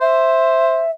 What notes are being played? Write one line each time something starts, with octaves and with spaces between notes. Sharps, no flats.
C5 E5